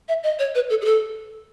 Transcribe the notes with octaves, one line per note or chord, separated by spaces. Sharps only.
E5
D#5
C#5
B4
A4
G#4
A4